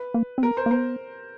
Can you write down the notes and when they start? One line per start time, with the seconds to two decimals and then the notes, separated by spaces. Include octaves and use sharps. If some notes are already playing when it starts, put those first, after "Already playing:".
Already playing: B4
0.14 A#3
0.38 C4
0.43 B3 A#4
0.57 C5
0.66 A#3
0.71 B3 C5